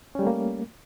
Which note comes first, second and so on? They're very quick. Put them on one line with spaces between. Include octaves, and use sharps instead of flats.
C#4 G3 A3 A#3